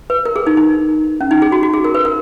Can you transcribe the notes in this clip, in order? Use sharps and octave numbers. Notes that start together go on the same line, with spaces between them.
B4
A#4
G#4
D#4
D#4
C#4
D#4
G#4
F#4
F#4
G#4
A#4
B4
A#4